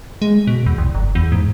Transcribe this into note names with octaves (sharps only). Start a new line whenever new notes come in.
G#3
B2
E2
C2
G1
E2
G#2